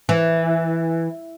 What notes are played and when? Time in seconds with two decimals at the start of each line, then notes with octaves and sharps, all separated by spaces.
0.09 E3